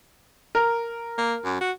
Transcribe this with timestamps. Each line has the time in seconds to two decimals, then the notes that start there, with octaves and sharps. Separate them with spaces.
0.55 A#4
1.18 A#3
1.45 F#2
1.61 F#4